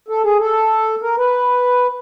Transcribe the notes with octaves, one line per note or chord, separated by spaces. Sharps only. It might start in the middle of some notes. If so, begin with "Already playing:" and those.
A4
G#4
A4
A#4
B4